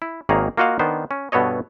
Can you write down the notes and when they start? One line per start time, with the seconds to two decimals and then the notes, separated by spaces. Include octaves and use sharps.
0.02 E4
0.29 G#1 D#3 A#3 G#4 C#5 A#5
0.57 A#3 F4 F#4 D#5 F5 F#5
0.79 D#3 B3 D4 C5
1.11 C#4
1.32 G2 B2 B3 A4 C#5 D#5